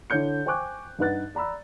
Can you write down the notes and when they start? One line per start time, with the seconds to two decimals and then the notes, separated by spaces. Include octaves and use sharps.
0.10 D3 E4 C#5 G6 C#7
0.46 C5 G5 G#5 C#6 D6 F#6
0.99 G2 D#4 B4 F#5 F#6 A6
1.35 D5 A#5 B5 E6